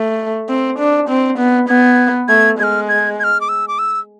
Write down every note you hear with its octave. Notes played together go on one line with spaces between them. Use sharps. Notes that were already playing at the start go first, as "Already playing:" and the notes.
Already playing: A3
C4
D4
C4
B3
B3 G#6
A3 G#6
G#3 F6 G#6
G#6
G#6
F6
D6
E6
D6
E6